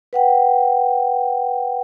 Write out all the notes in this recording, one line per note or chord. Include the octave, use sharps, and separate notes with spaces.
B4 F#5 G5